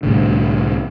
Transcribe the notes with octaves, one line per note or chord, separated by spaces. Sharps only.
C2 A2 D3